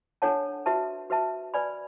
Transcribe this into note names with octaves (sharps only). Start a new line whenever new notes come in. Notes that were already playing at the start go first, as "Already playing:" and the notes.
D4 A4 C#5 F#5 A5
F#4 B4 E5 A5
F#4 B4 E5 A5
B4 D5 G#5 B5